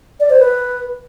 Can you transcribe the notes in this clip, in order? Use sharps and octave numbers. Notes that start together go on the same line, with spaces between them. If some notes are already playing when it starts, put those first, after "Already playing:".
D5
C5
B4